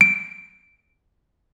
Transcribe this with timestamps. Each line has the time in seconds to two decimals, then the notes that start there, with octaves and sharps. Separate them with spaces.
0.01 D7